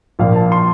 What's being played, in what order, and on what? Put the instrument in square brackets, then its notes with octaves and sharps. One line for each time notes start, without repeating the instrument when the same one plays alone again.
[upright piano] A#1 A#2 F3 F5
A5
C6